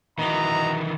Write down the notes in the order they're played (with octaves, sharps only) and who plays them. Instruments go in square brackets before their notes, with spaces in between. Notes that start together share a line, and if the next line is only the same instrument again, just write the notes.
[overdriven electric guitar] D#3 E3 [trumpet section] F#4 D#5 A#5